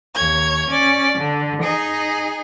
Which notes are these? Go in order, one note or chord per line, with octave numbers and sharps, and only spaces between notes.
D#2 C#5 G#6
C#4 D5
D3
D#4 G#4